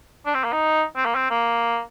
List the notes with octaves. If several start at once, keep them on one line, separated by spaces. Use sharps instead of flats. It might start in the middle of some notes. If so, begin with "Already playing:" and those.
D4
C4
A#3
D#4
C4
A#3
C4
A#3